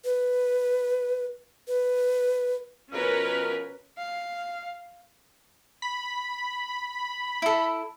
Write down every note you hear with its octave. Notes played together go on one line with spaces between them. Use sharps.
B4
B4
B2 F3 C#4 A#4 B4 F6
F5
B5
E4 A4